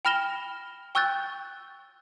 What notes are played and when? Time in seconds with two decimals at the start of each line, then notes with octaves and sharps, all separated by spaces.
0.05 G5 B5 F6 A#6 E7 G7
0.95 G5 C#6 E6 F#6 G6 A6